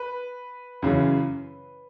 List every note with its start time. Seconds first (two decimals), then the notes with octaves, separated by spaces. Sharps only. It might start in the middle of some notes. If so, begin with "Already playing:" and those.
Already playing: B4
0.82 F#2 C#3 E3